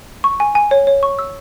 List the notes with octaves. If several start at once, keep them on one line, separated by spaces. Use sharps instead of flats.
C#6
G#5
G#5
C#5
C#5
C#6
E6